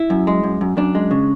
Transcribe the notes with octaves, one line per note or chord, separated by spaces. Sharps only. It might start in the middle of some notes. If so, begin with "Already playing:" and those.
Already playing: E4
F#2
G#3
F#2
F#2
F#2 D4
G#3
C#3